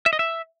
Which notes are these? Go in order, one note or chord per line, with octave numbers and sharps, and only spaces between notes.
E5
D#5
E5